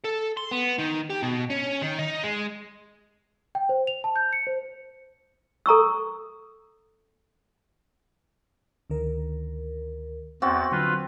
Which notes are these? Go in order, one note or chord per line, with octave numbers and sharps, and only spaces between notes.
A4
C6
B3
D#3
G4
B2
C#4
D#3
D#4
G#3
G5
C5
F7
A5
G6
C#7
C5
A4 A#5 C#6 E6
D2 D#3 A#4
E2 C4 F#4 A6
D3 F#3 F4 B4